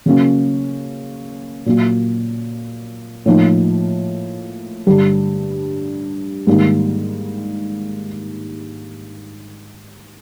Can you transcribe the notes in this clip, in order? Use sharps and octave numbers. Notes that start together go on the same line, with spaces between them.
C#3 F#3 A#3 C#4
A#2 F#3 A#3
A2 F3 A#3 D#4
G2 D3 G3
G#2 D#3 G3 A#3 D#4